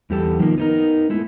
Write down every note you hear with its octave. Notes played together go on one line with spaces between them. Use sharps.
E2 G3 G4 A4
D#3 F3 A#3
B3 D#4 A#4
G#3 A3 E4